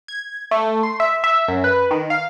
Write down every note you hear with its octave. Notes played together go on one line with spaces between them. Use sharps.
G#6
A3
C6
E5
E5
F#2
B4
D#3
F5